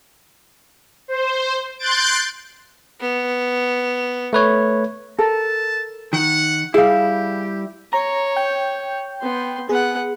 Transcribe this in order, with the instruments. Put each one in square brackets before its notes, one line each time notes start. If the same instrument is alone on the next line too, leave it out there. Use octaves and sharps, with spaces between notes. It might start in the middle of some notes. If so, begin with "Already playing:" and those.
[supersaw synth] C5
C6 F#6 G6 A6 D7
[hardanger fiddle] B3
[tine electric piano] A3 B4 C#5
[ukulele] A4 A#4 [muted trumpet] A5
[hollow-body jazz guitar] D#3 [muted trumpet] F#5
[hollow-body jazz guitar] G3 E4 [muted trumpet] G4 [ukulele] G#4 F5
[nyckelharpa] C#5 [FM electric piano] A#5
[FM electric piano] G5 G6
[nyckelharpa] B3 C6
[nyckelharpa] B3 F#5 [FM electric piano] G#4